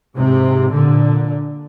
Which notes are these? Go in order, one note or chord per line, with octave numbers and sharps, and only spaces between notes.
G#2 C3
A#2 D3